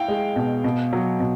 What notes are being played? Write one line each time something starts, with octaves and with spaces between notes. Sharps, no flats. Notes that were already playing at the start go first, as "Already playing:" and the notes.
Already playing: E4 F5 G5
G#3
B2
B2
F#3
B2